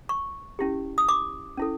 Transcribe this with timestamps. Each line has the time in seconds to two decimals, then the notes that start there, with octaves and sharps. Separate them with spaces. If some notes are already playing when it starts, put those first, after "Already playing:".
0.09 C#6
0.59 C#4 E4 G4
0.98 D#6
1.09 D6
1.57 C#4 E4 A4